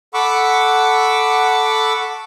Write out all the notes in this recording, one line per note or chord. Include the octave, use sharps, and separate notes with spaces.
A4 F#5 B5 C#6 D6 E6